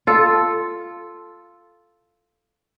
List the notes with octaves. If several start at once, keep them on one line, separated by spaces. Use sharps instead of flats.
F4 A4